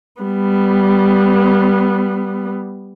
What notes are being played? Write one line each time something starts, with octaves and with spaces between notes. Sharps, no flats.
G3 B3